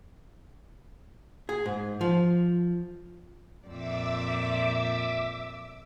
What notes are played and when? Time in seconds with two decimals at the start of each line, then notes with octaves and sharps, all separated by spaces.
1.49 G#4
1.66 G#2
2.01 F3
3.66 F2 A#2 D5 E5 D6 E6